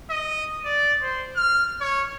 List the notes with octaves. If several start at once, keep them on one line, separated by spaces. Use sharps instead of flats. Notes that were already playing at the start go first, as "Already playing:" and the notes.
D#5
D5
C5
F6
C#5